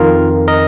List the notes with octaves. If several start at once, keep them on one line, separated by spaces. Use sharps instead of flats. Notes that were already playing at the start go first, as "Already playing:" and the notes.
Already playing: F2 D#3 F4 A#4
A#4 D#5